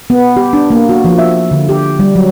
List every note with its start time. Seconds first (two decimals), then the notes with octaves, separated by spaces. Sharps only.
0.10 B3
0.37 G4
0.53 D4
0.70 A#3
0.89 F#4
1.05 F3
1.18 E5
1.51 D3
1.69 G4
1.99 G3
2.15 F#3